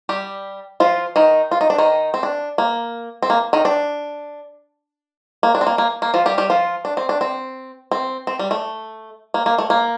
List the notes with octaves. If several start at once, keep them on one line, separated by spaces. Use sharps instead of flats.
G3 G4
F3 F4
D#3 D#4
F4
D#4
D4
D#3 D#4
C4
D4
A#3
C4
A#3
D#3 D#4
D4
A#3
D4
C4
A#3
A#3
A#3
F3 F4
G3 G4
G3 G4
F3 F4
D4
C4
D4
C4
C4
C4
G3
A3
A#3
A#3
A3
A#3